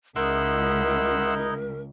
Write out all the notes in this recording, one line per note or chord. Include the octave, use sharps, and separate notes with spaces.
C#2 D#4 E4 A#4 D#5 E5 F#5 C6